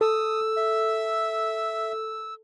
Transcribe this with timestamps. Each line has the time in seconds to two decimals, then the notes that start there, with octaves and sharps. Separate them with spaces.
0.01 A4 D#6 E6
0.57 E5